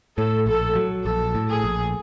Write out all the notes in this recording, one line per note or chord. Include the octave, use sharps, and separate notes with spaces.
A2 A4
A#1 A4
F#3
A#1 A4
A2
G#4
A#1